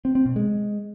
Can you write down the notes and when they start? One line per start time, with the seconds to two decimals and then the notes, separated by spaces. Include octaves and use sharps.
0.05 C4
0.15 C4
0.26 B2
0.36 G#3